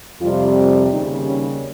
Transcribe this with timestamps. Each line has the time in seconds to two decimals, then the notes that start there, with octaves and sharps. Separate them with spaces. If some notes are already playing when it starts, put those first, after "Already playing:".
0.21 F2 C3 G3 F4
0.90 D#2 C#3 G3 D#4
1.26 C#4